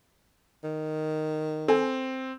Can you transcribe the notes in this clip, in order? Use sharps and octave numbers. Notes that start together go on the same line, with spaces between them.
D#3
C4 A4 G#5